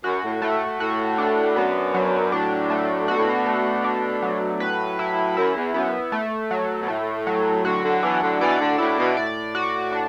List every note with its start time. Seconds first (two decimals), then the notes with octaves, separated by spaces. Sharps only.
0.04 F#2 F#4
0.23 A2
0.42 A2 A3
0.80 A2 F#4
1.18 D4
1.56 F#2 B3
1.94 F#3
2.32 A2 D4
2.70 A3
3.08 B2 F#4
3.16 A2
3.24 B2
3.46 A3
3.84 D4
4.22 F#3
4.60 A2 B4
4.99 E4
5.37 F#2 E4
5.55 E2
5.74 F#2 B3
6.12 A3
6.51 F#3
6.82 B2
6.88 A2 A3
7.27 F#3
7.65 A2 D3 F#4
7.84 A2 D3
8.02 B2 E3 D4
8.22 A2 D3
8.40 B2 E3 D5
8.59 A2 D3
8.78 A2 E4
8.98 B2
9.17 A2 D5
9.55 F#4
9.92 D4